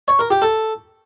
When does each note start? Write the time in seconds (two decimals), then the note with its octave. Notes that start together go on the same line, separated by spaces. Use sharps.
0.08 C#5
0.19 A#4
0.31 G4
0.42 A4